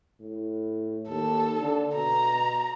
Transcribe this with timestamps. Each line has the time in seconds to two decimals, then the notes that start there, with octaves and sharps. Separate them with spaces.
0.21 A2
1.09 D#2 A4
1.60 D3
1.95 B2 A#5